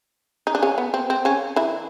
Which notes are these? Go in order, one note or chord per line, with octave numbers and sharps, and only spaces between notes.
D#4
D4
C#3 C#4
B3
C4
C4
C#3 C#4
E3 E4